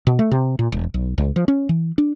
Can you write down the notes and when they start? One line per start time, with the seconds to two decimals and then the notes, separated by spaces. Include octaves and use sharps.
0.07 B2
0.19 A3
0.31 C3
0.59 A#2
0.72 E1
0.94 B1
1.18 C#2
1.36 F3
1.48 C#4
1.69 E3
1.98 D4